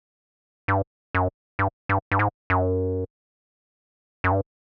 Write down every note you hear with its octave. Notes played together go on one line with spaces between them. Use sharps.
G2
F#2
G2
G2
G2
G#2
F#2
F#2
G2